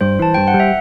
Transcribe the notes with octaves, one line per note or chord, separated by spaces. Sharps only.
G2 C5
E3 A5
G2 G5
F#5
G3
E5